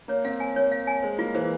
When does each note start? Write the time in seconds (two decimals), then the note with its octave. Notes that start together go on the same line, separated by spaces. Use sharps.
0.08 A#3 C#5
0.25 C4 F5
0.40 G#5
0.56 A#3 C#5
0.72 F5
0.87 G#5
1.03 G#3 C5
1.18 A#3 F4
1.35 E3 C5